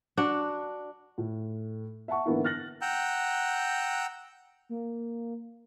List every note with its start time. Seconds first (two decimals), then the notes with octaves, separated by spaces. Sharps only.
0.17 D4 F#4
1.18 A2
2.08 E5 F#5 A5 C#6
2.26 G#2 D3 E3 A#3 B3 E4
2.44 F6 F#6 A6 A#6 F#7
2.82 F#5 G5 A#5 E6 F#6 G6
4.69 A#3